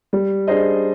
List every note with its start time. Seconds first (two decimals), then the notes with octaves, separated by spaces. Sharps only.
0.13 G3
0.47 D4 G#4 C5 D#5